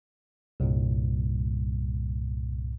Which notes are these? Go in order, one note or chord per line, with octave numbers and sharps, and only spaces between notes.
C2 G2 A#2